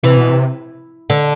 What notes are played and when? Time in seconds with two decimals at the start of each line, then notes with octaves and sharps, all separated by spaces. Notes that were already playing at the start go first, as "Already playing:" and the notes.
0.03 C3 E3
0.17 B2
0.30 C3
1.10 D3